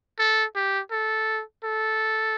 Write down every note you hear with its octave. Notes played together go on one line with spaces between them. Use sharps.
A4
G4
A4
A4